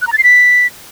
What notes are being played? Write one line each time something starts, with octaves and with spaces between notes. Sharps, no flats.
F#6
A#5
A6
C7
B6